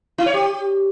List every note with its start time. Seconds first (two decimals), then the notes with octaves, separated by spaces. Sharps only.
0.18 E4
0.26 C#5
0.34 G4